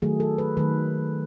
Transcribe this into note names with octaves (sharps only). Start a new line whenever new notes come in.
D#3 F#3 A3 G#4
A4
B4
D#3 F#3 A3 B4